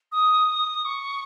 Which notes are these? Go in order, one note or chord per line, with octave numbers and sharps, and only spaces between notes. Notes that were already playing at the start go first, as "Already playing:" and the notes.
D#6
D#6
C#6